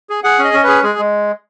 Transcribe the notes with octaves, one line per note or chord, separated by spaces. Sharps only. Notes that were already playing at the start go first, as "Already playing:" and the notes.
G#4
G#4 F#5
C#4
D#5
C#4
G#4 B4
G#3 G#4
G#3